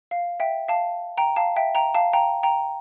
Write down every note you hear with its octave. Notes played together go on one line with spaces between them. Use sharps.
F5
E5 G5
F5 A5
G5 A#5
F5 A5
E5 G5
G5 A#5
F5 A5
G5 A#5
G5 A#5